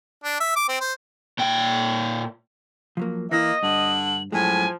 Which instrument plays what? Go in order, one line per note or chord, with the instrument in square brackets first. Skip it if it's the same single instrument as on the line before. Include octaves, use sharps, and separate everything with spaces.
[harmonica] D4
E5
D6
C4
C5
[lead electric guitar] A#2 G5
[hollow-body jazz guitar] F3 F#3 A#3
[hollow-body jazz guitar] E3 E4 [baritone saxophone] A#3 [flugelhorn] D#5 [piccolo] A#6
[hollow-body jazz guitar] G2 [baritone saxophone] D3 [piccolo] F#7
[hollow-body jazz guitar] F#2 G#3 [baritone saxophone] A2 [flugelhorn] F3 [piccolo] G#5